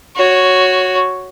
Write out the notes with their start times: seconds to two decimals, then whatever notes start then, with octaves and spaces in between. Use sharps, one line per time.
0.15 F#4 C#5